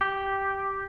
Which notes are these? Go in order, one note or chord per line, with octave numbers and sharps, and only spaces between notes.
G4